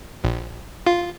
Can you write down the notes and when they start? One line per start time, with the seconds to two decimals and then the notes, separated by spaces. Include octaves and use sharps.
0.24 A#1
0.87 F4